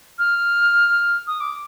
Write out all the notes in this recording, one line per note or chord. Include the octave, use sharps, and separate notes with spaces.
F6
D#6
D6